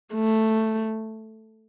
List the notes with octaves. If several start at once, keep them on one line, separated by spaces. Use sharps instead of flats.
A3